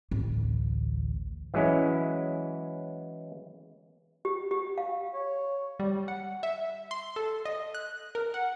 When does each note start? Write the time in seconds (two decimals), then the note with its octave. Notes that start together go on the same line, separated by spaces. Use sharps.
0.11 A1 D2
1.54 E3 F#3 G#3 C#4 E4
4.25 G4
4.51 G4
4.78 F5
5.14 C#5
5.79 G3
6.08 F#5
6.43 E5
6.91 C6
7.16 A4
7.45 D#5
7.75 F#6
8.15 A#4
8.34 F#5